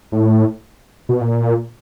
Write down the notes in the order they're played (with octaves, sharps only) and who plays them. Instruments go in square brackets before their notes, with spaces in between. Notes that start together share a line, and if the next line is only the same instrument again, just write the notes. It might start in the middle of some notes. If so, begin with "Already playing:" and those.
[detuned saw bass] A2
B2
A#2